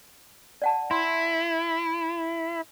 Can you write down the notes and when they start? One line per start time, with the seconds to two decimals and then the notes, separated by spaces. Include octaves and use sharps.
0.62 D5 F#5 A5
0.91 E4 C6